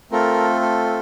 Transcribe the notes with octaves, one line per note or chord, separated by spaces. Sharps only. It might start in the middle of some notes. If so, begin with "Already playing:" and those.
A3 C4 F4 A4 A#4
A4